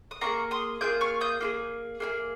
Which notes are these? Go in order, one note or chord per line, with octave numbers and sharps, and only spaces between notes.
D#6
A#3 F4 G#4 A#5 C#6
C6 D#6
A#3 F4 G#4 D#6 G6
C#6 F6
D#6 G6
A#3 F4 G#4
A#3 F4 G#4